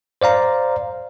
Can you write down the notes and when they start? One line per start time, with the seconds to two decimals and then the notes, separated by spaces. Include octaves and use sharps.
0.22 C5 D5 F5 A#5